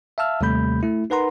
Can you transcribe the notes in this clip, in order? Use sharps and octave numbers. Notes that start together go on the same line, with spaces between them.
E5 F5 A5 E6 F6
D#2 C3 G3 A3 B5 G6
A3 E4
D#4 A#4 B4 F#5 A#5 C6